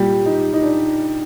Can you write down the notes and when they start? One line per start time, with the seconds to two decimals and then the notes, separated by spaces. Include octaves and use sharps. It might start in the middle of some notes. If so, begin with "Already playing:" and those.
Already playing: A#2 G3 G4
0.26 D#4
0.54 D#4
0.63 D4